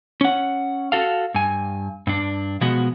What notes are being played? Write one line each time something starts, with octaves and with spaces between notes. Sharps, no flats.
C#4 F#5
F#4 A4 F5
G2 G#5
G2 D4
B2 F3 G#3 B3 F#4